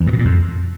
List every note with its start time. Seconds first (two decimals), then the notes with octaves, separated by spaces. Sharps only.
0.01 E2
0.07 G2
0.13 B2
0.19 A#2
0.25 F2